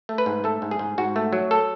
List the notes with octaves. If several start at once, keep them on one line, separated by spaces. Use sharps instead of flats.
A3
B4
G#2
A3 A4
G#2
G#4
G#2
G#2 F#4
A3
F#3
A4